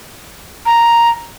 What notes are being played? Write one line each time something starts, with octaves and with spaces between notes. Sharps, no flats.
A#5